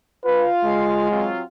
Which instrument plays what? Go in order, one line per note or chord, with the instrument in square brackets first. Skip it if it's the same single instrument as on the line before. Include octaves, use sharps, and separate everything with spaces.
[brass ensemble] F4 F5 [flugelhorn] B4
[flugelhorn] G#3
[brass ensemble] F#3 C4 F4